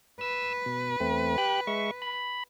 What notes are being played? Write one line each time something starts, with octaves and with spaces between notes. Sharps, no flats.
B4 E6
B2
E2 A3 C4
G4 G5 F#6
G#3 E5 C#6
B5